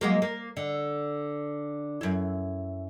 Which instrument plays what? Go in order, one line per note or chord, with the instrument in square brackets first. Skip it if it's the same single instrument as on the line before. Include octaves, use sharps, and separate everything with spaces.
[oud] F#3 G#3 A#3
A#3
D3
F#2 E4